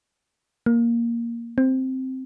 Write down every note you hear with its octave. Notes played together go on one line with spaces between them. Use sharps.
A#3
C4